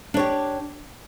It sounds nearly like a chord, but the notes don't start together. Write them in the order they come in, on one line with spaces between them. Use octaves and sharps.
D4 C#5 G4